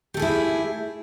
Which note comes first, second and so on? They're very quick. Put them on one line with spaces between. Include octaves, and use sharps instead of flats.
G4 A3 G#4 E4